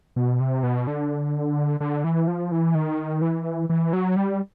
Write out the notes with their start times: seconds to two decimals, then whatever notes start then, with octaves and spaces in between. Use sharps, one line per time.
0.16 B2
0.40 C3
0.63 B2
0.87 D3
1.80 D3
2.04 E3
2.27 F3
2.51 E3
2.75 D#3
3.21 E3
3.69 E3
3.93 F#3
4.16 G3